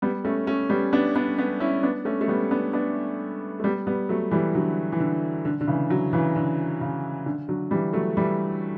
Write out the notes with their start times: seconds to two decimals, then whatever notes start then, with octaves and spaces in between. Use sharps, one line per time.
0.02 G3 B3
0.25 A3 C#4
0.47 A3 C#4
0.70 G3 B3
0.93 B3 D4
1.15 B3 D4
1.38 B3 D4
1.60 C#4 E4
1.83 B3 D4
2.05 A3 C#4
2.21 A3
2.28 G3 B3
2.51 B3 D4
2.73 B3 D4
3.60 A3
3.64 G3 B3
3.87 G3 B3
4.09 F#3 A3
4.31 E3 G3
4.55 D3 F#3
4.92 E3
5.00 D3
5.45 D3
5.61 D3
5.67 C#3 E3
5.90 D3 F#3
6.13 C#3 E3
6.36 D3
6.81 C#3
7.26 D3
7.49 D3 F#3
7.71 E3 G3
7.93 F#3 A3
8.17 E3 G3